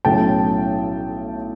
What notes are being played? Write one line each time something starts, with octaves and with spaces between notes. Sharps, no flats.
B1 A2 F#3 A3 C#4 G5 A5